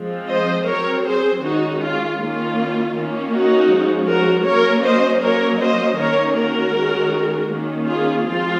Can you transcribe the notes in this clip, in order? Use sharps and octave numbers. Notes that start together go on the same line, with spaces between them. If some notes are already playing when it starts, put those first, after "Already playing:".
Already playing: F3 G#3 C4
C5 D#5
F#3 C4 A#4 C#5
G#4 C5
D#3 G#3 C#4 D#4 F#4
F4
D#3 A#3 C#4 F4
D#3 A#3 C#4
D#4 F#4
F3 G#3 C#4
F#4 A#4
F#3 A#3 C#4 A#4 C#5
C5 D#5
F#3 A#3 C#4 A#4 C#5
C5 D#5
D#3 A#3 C#4 A#4 C#5
F#4 A#4
D#3 G#3 C#4
D#3 A#3 C#4
F4 G#4
F3 G#3 C4 F4